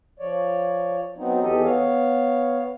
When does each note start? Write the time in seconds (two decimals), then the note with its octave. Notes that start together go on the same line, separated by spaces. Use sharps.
0.20 F3 C#5 D5
1.18 F#3 B3 C4 D#4
1.43 E2 E3 G4 A4 D#5
1.64 B3 C#5 F5